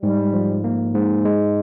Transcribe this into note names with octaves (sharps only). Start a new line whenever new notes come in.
G#2 G3
F3
A#3
G#2
G#3